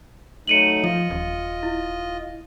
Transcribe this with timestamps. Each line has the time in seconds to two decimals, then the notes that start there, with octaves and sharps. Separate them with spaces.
0.47 F#3 A3 D#4 C#7 D#7 F#7
0.84 F3 F4 D#5
1.10 D#1
1.63 E4